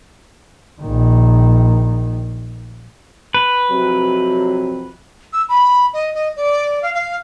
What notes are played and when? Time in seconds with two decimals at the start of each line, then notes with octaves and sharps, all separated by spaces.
0.82 A#1 D#3
3.34 B4
3.71 F2 C3 F#3
5.33 E6
5.49 B5
5.93 D#5
6.14 D#5
6.36 D5
6.82 F5
6.94 F5